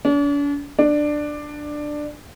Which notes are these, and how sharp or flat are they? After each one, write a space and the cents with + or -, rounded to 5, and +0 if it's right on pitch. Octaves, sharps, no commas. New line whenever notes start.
D4 -45
D4 +10